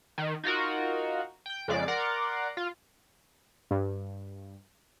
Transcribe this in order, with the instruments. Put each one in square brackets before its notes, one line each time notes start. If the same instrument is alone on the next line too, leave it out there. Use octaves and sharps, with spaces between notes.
[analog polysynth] D#3
D#4 F4 F#4 A#4
G5 G6
F2 C#3 G#3 D5 D6 C7
A#4 D5 F#5 A#5 C6 D6
F4
[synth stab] G2